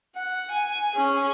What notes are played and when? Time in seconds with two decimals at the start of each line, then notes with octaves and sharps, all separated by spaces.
0.15 F#5
0.51 G#5
0.95 C#4 G#4